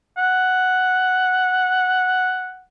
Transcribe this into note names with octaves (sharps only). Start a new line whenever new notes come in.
F#5